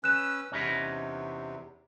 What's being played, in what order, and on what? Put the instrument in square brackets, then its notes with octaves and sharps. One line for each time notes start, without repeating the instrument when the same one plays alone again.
[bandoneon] C#4 B4 E6 [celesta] F#6 E7
[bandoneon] E2 C3 [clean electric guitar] C#4 D#4 B4